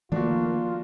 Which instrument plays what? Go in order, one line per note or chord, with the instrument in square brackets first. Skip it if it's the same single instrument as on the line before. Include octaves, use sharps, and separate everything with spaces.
[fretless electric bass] D#3 F3 A3 [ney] A#3 [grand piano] D4 F#4 [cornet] F4